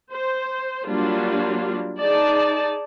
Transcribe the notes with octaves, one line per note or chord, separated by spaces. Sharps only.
C5
F#3 G3 A#3 D4 F4
D#4 G#4 D5 A5